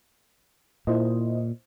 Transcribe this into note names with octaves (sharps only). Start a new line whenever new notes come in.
A#2 E4 C5 D#5